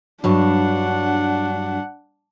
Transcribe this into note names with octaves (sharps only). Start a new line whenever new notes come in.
G2 F#3 D4 F#5 A5